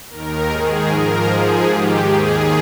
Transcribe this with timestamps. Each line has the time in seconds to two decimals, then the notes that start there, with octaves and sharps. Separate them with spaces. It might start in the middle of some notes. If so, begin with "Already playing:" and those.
0.10 D#2 D#3 A#4
0.49 G#2 D#3 G#4
0.88 G#2 F3 A#4
1.27 G#2 F3 G#4
1.67 G#2 D#3 G4
2.06 D#2 D#3 G#4